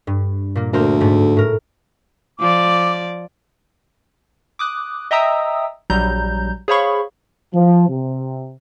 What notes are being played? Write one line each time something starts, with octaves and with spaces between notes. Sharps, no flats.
G2
A#2 A#3
D2 A#3 A#4 C5
G#2 A3
A2 A#4
F3 D5 D6
D6 D#6 F#6
D#5 E5 G5 A#5 D#6 E6
A#1 F#3 G3 A#5 G6
G#4 C5 C#5 F5 B5 C#6
F3
C3